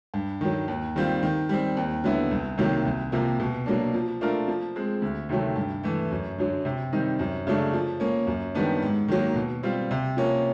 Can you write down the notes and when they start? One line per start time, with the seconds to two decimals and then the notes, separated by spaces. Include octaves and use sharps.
0.14 G2
0.41 D#3 F#3
0.68 D#2
0.96 D#3 G3 C4 F4
1.23 D#3
1.49 G3 C4
1.77 D#2
2.04 D3 F#3 B3 E4
2.31 C2
2.58 C3 D#3 F#3 A#3
2.85 C2
3.12 C3 F3 A#3
3.40 B2
3.66 F#3 A#3 D4
3.94 F3
4.21 A3 D4 F4 A#4
4.48 F3
4.76 G#3 C4
5.02 D2
5.29 C3 D#3 F#3 A3
5.56 G2
5.83 E3 A3
6.11 F#2
6.38 D3 F#3
6.65 C3
6.92 D#3 G3 C4 D#4
7.19 F#2
7.47 C#3 F#3 A3 D4
7.73 F3
8.00 A#3 C#4
8.27 F#2
8.55 D#3 G3 B3 D4
8.82 G#2
9.08 D#3 F#3 A#3
9.35 B2
9.63 G3 C4 F4
9.91 C3
10.17 F3 A#3 C#4